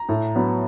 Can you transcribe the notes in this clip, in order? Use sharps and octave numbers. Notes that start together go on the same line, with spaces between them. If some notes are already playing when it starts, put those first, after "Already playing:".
Already playing: A#5
A2
F#3 B3